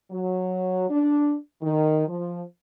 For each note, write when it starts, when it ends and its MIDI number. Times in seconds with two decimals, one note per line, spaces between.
0.11 0.87 54
0.90 1.35 62
1.62 2.06 51
2.07 2.42 53